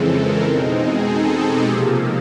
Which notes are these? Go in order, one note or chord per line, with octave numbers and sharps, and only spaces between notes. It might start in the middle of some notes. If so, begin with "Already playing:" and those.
Already playing: F2 C#3 E3 G#3 C4 A4
A#4
B2 G#3 C4 D#4
G#4
A4
G4
C3 F3 A#3 G#4